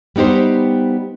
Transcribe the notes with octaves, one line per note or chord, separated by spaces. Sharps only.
G3 B3 D#4 G4 C5